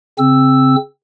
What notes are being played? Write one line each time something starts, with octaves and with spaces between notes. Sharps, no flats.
C#3 C4 E6